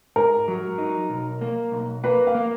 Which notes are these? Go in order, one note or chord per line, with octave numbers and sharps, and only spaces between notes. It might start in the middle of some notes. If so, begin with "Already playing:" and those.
G#2 A#4
F#3
D#4
B1
A#3
B1
A#3 B4
F5
A#3